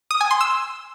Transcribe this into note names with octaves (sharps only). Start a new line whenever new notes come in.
D#6
G#5
C6
E6